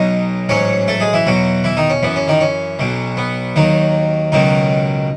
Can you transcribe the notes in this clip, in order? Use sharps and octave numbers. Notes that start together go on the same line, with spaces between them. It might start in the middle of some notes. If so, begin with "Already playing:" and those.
Already playing: B1 B2 F#3 D#4 D#5
A1 G#2 F#3 C#4 C#5
A3 A4
G#3 G#4
E3 E4
E2 B2 F#3 F#4
E3 E4
D#3 D#4
C#4
F#2 E3 B3
C#4
D#3 D#4
C#4
B1 B2 F#3
B3
D#2 D#3 F#3 D#4
C#2 B2 D#3 F#3 D#4